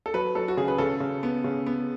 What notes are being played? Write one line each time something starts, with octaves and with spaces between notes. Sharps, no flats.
A4
F#3 B4
F#3 A4
F#4
C#3 G#4
B4
C#3 A4
C#3
B3
C#3
B3